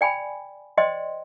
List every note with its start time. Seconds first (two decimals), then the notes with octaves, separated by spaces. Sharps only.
0.01 D5 G5 G#5 B5
0.77 C5 D5 D#5 G5 C6